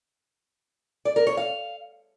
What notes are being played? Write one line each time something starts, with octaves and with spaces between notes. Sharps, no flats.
D5
A#4
C#5
F5